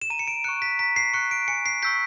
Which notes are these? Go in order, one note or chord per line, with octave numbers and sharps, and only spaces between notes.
E7
A#5 D#7
C#7
D7
C#6 F#6 C#7
B6
A#5 B6
C7
C#6 F#6 C#7
D7
G#5 C#7
C7
C#6 E6 G6 B6